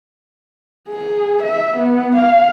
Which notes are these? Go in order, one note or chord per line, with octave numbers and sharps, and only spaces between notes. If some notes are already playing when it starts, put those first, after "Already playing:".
G#4
E5
B3
F5